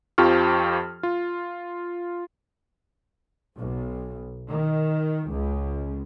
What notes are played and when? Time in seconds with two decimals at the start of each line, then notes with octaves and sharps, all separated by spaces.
0.18 F2 F3 F4 G4 C#6 F6
1.03 F4
3.58 B1
4.50 D#3
5.30 C#2